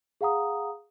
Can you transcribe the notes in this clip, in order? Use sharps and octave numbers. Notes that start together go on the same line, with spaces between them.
G#4 F5 F#5 A#5 D#6